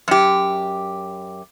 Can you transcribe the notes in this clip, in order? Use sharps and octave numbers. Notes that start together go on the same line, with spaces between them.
F#2 G4